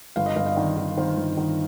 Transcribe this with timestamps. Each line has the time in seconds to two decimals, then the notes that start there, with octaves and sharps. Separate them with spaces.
0.16 G1 F5
0.26 D#5
0.36 G1 F5
0.46 F5
0.52 D#5
0.57 D#3 D5
0.77 D#3
0.97 D#3 C5
1.17 G1
1.37 D#3